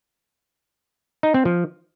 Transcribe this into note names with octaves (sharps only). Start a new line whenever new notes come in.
D#4
C4
F3